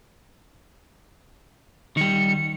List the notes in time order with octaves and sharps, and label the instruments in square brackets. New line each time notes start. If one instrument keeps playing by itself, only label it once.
[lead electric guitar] D#3 G3 [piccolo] C#7